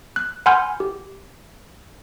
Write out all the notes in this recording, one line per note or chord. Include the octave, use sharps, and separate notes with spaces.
F#6
F#5 G#5 B5 C6 F6 G6
G4